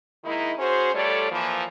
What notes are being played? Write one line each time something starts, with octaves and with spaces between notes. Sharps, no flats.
D#3 G#3 A#3 D#4 E4
C#4 F#4 G#4 C5
G3 A3 F4 A4 C#5 D5
E3 F3 A#3